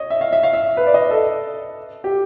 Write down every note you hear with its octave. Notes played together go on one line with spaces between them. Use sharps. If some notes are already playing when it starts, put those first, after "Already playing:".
Already playing: C#5 D#5
E5
F5
E5
F5
E5
B4
D5
D#5
A4
G4